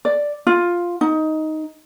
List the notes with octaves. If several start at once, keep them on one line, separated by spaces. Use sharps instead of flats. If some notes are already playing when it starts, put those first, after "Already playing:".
D5
F4
D#4